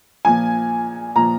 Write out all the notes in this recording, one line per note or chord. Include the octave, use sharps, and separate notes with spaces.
A#2 F3 G#5
A#2 F3 A#5